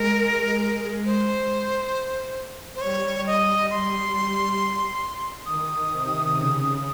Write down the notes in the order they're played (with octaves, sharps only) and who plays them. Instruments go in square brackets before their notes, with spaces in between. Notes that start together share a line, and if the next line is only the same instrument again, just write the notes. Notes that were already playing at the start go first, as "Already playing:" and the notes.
Already playing: [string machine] G#3 [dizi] A#4
[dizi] C5
C5
[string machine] G3 [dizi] C#5
[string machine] G3 [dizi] D#5
[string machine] G3 [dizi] C6
[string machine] D#3 [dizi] D#6
[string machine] C3
C#3